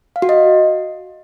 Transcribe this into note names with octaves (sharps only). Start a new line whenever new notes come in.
F5
F#4
D#5